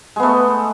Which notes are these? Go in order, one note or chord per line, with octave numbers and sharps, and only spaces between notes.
G#3 A3 B3